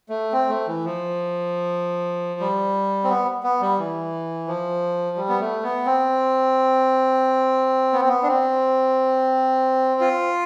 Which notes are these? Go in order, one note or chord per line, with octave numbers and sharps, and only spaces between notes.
A3
C4
A3
E3
F3
G3
C4
B3
B3
G3
E3
F3
G3
B3
A3
B3
C4
B3
C4
B3
D4
C4
F4